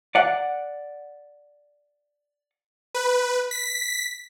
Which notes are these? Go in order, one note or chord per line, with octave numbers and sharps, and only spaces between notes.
D5 F#5
B4
B6